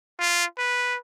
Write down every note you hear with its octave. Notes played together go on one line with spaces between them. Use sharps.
F4
B4